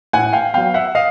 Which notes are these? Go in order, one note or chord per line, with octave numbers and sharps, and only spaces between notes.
A2 F#5 G#5
F5 G5
F#3 B3 F5 G5
E5 F#5
D#5 F5